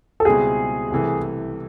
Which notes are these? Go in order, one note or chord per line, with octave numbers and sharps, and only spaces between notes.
A4
C#2 B2 G3 C4 E4 G#4
C2 C3 E3 A3